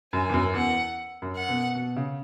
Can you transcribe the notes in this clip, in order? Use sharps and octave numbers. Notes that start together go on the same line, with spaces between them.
F#2 G#5
E2
F#2
E2 F#5
F#2
F#5
B2
B2
C#3